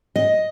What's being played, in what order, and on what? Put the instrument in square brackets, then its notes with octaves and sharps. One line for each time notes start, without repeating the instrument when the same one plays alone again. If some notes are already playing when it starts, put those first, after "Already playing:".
[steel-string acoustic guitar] D#5